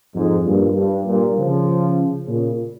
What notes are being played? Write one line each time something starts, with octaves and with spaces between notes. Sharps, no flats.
F2 G#2
G2 A#2
G2
G2 A#2
C#3 F3
A#2 C#3